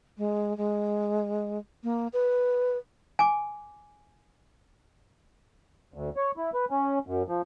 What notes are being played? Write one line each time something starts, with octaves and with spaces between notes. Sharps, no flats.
G#3
G#3
A#3
B4
G#5 D6
D2
C#5
E4
B4
C#4
F#2
F3